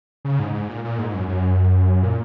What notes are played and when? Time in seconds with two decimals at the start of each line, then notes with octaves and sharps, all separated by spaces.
0.25 C#3
0.39 G#2
0.54 G#2
0.69 A#2
0.84 A#2
0.99 G#2
1.14 F#2
1.28 F#2
2.03 A#2